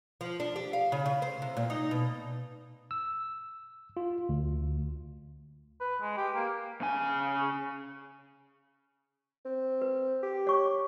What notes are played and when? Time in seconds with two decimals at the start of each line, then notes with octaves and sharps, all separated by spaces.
0.21 F3
0.40 D4
0.56 G4
0.73 F5
0.92 C#3
1.06 C#3
1.22 C5
1.42 C3
1.57 A#2
1.70 D#4
1.91 B2
2.91 E6
3.97 F4
4.29 D2
5.81 B4
6.02 G#3
6.18 G4
6.35 A#3
6.81 C#3 G#5
9.45 C4
9.82 B4
10.23 G4
10.47 C#5 C#6